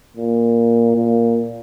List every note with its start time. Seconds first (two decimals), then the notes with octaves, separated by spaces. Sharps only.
0.17 A#2
0.96 A#2